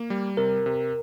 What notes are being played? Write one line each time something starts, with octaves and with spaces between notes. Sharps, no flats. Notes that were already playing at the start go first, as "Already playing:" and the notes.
Already playing: A#3
G3
C3 A#4
C3